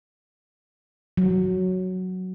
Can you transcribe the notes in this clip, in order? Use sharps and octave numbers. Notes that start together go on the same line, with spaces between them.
F#3